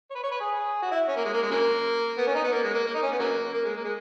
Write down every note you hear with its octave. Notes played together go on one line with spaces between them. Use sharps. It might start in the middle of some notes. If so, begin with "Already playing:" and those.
C#5
B4
C#5
B4
G#4
F#4
E4
C#4
A#3
G#3
A#3
G#3
C#3 F#3 A#3
B3
C#4
D#4
B3
A#3
G#3
A#3
A#3
D#4
C#4
B3
C#3 F#3 A#3
A#3
G#3
A#3
G#3